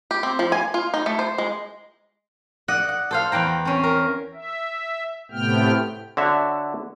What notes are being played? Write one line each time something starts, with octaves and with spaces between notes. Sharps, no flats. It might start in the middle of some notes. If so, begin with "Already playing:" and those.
G4
C4
F3
G#5
F4
D#4
A3
C5
G#3
D5 D#5 F#5
F#5
A4 C5 F5
E2 B4 G5 A#5
C4 C#4
A#4
E5
A2 C3 A3 B3 G5 F6
D3 F#4 C#5 E5